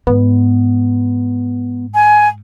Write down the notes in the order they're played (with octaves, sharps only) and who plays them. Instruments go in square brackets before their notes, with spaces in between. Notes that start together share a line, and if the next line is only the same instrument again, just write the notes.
[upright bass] G#2 [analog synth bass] B3
[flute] G#5